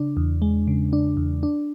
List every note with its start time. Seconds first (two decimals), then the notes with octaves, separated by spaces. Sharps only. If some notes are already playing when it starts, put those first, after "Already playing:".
Already playing: C#3 D4
0.17 E2
0.42 G#3
0.67 C#3
0.93 D4
1.17 E2
1.43 D4